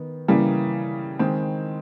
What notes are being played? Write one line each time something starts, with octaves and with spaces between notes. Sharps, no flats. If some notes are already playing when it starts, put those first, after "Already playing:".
Already playing: D#3 B3
C#3 E3 G3 A#3
D#3 G#3 C4